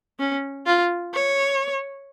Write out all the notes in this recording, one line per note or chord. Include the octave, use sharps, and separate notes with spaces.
C#4
F4
C#5